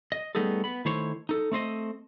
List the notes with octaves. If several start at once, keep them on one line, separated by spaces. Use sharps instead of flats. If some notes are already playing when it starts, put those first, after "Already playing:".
D#5
G3 A3 B3 D#4 G#4 A4
B3 B5
D#3 A3 E4 C5 C#5
D#4 A4
A3 C4 C5 D#5